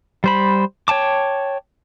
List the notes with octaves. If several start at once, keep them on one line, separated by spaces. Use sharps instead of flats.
G3 C5 B5
C#5 G5 A5 D6